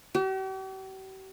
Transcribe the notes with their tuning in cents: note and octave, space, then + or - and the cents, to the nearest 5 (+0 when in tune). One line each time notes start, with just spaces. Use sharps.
G4 -45